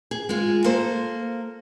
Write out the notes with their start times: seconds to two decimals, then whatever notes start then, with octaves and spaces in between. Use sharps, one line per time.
0.11 G#4
0.29 G#3 F4
0.64 A#3 A4 C5